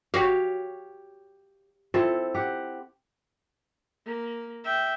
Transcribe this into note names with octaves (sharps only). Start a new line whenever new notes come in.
F#4 G4 C#5 F5
C4 E4 F4 A4
G4 F#5
A#3
E5 G5